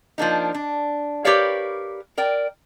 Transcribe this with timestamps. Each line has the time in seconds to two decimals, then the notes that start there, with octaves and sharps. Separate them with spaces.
0.18 F3 A#3 D4 D#4
0.54 D4
1.25 G4 A#4 B4 C#5 D5 F5
2.18 A#4 D5 G5